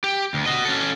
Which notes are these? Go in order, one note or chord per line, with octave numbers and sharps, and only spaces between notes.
G4
D2
F#4 D#5
C#4 A4